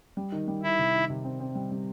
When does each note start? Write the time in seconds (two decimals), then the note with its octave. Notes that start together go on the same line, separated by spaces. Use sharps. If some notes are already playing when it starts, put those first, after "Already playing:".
0.17 G3
0.32 D#3
0.48 G3
0.63 D#3 E4
0.79 C3
0.94 D#3
1.10 C3
1.24 C4
1.40 C4
1.55 G3
1.71 G3